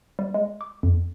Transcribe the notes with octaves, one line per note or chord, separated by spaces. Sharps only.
G3
G#3
D6
F2